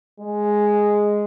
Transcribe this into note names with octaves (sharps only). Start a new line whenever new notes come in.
G#3